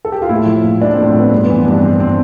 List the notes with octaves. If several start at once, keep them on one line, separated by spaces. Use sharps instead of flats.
A4
G4
F4
A2 E4
F3
A2
F3 D4
C4
A2
C4
F3 B3
G2 C4
B3
E3
C4
G2 D4
E3 C4
C4